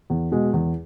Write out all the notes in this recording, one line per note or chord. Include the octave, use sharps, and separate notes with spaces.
E2
B2 G#3
E2